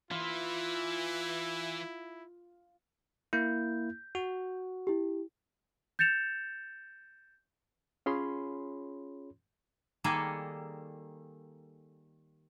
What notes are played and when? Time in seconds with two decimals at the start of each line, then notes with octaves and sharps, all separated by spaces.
0.11 E3 E4 F4
3.33 A#3 E4 G6
4.15 F#4
4.87 E4 G4
5.99 G6 A6 C#7 E7 F7
8.06 C#4 F4 G#4 C#5 B5 C6
10.04 D#3 G3 A#3 G#4 A4